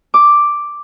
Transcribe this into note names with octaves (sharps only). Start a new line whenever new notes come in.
D6